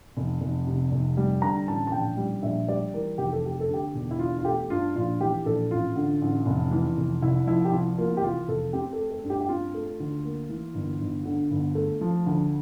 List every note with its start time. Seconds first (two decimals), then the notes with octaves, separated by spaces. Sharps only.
0.17 F1
0.41 F1
0.67 C3
0.91 F1
1.17 G3
1.41 D3 A#5
1.67 A1 A5
1.87 A5
1.92 A#1 G5
2.17 G3
2.42 A#1 E5
2.68 G3 D5
2.93 E3 A#4
3.18 F1 G4
3.33 A4
3.43 A3 G4
3.60 A4
3.68 D3
3.74 G4
3.95 E1
4.11 E4
4.19 D4 F4
4.39 F4
4.45 A3 G4
4.70 G2 F4
4.95 A#1 F4
5.20 E3 G4
5.46 A#1 A4
5.71 A1 F4
5.96 D3
6.22 A1
6.46 F1
6.71 E3
6.97 F1
7.22 C2 E4
7.47 F3 E4
7.65 G4
7.72 C2 F4
7.98 A#3 F4
8.17 G4
8.22 E3 F4
8.48 F1 A4
8.73 C4 G4
8.93 A4
8.99 A3
9.11 A4
9.23 G2
9.30 G4
9.41 G4
9.48 C4 F4
9.74 A3
10.00 D2
10.25 A#3
10.49 E3
10.74 G1
11.01 G1
11.25 D3
11.51 G1
11.75 A3
12.01 F3
12.27 D2